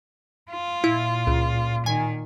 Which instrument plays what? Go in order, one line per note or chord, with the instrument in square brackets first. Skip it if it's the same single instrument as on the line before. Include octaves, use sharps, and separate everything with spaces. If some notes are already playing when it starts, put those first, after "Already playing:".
[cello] F4
[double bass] A#2 [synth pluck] E4
[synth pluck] C#2
[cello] D#3 [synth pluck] G#5